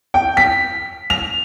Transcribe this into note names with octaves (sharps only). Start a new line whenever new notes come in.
G5
B6
F7